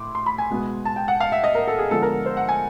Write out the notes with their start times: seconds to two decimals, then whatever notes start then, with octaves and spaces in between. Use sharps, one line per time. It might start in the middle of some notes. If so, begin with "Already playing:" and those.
Already playing: A2 C6 D6
0.15 C6
0.26 B5
0.38 G#5
0.50 B2 G#3 B3
0.85 A5
0.96 G5
1.08 F#5
1.20 F5
1.32 E5
1.44 D#5
1.55 A#4
1.68 A4
1.79 G#4
1.91 D3 F3 G#3 B3 A4
2.02 A#4
2.26 C5
2.37 F#5
2.49 G#5